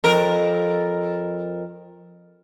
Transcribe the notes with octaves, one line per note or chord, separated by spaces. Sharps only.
F2 A#4